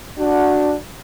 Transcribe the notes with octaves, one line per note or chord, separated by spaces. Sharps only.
D4 F#4